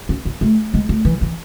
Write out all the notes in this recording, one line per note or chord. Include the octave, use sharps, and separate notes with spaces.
C#4
B3
A3
G#3
A3
E3
E3